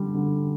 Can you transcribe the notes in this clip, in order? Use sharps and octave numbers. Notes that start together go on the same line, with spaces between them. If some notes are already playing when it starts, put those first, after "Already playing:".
Already playing: D3 G3
D3